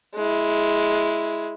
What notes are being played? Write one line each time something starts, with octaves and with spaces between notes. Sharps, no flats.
G#3 E4